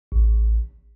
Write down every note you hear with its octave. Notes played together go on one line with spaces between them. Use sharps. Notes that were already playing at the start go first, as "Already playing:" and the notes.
A1